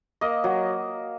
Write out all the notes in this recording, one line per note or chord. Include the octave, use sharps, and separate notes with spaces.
A#3 D#5
F#3